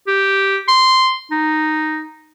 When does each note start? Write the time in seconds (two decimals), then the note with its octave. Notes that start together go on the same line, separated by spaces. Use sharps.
0.08 G4
0.68 C6
1.31 D#4